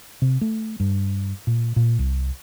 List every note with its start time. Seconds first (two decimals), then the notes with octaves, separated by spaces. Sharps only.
0.22 C3
0.41 A3
0.80 G2
1.47 A#2
1.76 A#2
1.99 C2